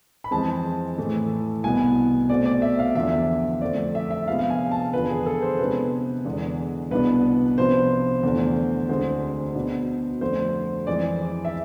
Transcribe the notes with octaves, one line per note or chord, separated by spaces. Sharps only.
B5
F2 E3 G#3 C4 A5
A2 E3 A3
C2 B2 B3 G#5
B2 A3 C4 D5
D5
E5
F5
E2 D3 F3 E5
F2 D3 A3 C4 D5
E5
E5
C3 F3 G#3 B3 D4 F5
F5
G#5
A5
E2 D3 F3 B3 B4
G#4
A4
C5
C3 G#3 B3 D4 B4
E2 D3 G#3
C2 B2 B3 D4 B4
C3 F3 B3 D4 C5
E2 D3 A3 D4
D2 D3 G#3 C4 C5
B2 B3 D4
F2 D3 A3 C5
F2 E3 G#3 D5
E5